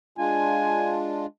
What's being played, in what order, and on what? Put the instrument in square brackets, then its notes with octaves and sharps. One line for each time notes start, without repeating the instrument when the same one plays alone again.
[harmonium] G#3 D4 F4 [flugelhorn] G#5